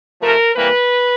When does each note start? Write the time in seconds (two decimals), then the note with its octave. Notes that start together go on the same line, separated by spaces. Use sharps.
0.21 C3 F3 A3 A#4
0.56 C3 E3 G3 A#3 B4